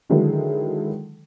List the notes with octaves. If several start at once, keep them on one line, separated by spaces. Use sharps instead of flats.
D3 D#3 F#3 G#3 E4 A4